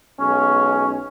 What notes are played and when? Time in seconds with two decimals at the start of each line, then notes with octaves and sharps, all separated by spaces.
0.20 B1 G#3 C#4